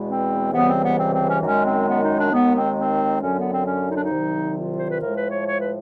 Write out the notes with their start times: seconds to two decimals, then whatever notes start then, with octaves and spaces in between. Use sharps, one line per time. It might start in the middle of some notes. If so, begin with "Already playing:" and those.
Already playing: E2 B2 G#3
0.08 C4
0.52 C#2 C3 E3 G3 B3
0.68 C4
0.82 B3
0.97 C4
1.12 C4
1.28 C#4
1.42 F#2 D#3 G#3 C#4
1.64 C4
1.87 B3
2.02 D#4
2.16 D4
2.31 D#2 D#3 G#3 B3
2.54 C4
2.76 C4
3.21 F#2 D3 F#3 C#4
3.36 B3
3.51 C4
3.66 C#4
3.88 D#4
3.95 D4
4.02 D#4
4.10 C2 C3 D#3 F#3
4.55 F4
4.77 C5
4.89 B4
5.00 A2 F3 G#3 A#4
5.15 B4
5.30 C#5
5.45 C#5
5.59 B4